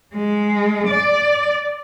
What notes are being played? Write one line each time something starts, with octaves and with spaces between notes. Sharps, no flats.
G#3
D5